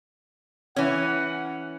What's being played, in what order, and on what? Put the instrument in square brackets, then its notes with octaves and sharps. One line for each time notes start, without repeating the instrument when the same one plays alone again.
[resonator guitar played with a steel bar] E3 C#4 [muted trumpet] F#5